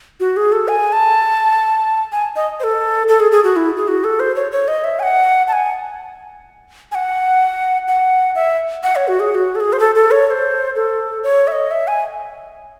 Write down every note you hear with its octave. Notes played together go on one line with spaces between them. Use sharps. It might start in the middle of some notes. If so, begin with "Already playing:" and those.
F#4
G#4
A4
G#5
A5
G#5
D#5
C5
A4
A4
G#4
G#4
F#4
E4
G#4
F#4
A4
C5
C#5
C#5
D#5
E5
G#5
F#5
A5
G#5
G#5
F#5
F#5
E5
F#5
C#5
F#4
G#4
G#4
F#4
A4
G#4
C5
A4
A4
C#5
C#5
C5
A4
C#5
E5
D#5
E5
G#5